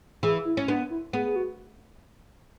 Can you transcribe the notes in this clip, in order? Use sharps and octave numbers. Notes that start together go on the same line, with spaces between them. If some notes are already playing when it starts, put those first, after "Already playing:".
E3 G#4
E4
C#4
B3 D4
E4
B3 G#4
G#4
F#4